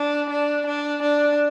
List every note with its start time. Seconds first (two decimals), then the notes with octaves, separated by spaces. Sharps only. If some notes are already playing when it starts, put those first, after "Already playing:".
Already playing: D4
0.30 D4
0.66 D4
1.03 D4